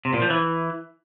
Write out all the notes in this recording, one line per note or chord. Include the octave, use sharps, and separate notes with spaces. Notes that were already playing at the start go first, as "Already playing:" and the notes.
C3
A#2
F3
E3